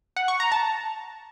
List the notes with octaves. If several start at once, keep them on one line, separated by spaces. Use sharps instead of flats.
F#5
C#6
A#5
A5